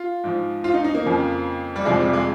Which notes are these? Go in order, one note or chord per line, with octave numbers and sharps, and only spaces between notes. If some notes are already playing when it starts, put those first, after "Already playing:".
Already playing: F4
G#2 F3
F4
D#4
D#4
A#3
F2 C#3 F3
G3
F2 C3 F3 G#3
G3
G#3